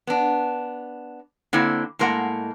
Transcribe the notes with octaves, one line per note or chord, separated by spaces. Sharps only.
B3 D4
D3 A#3 C4 E4
A2 G#3 A#3 F#5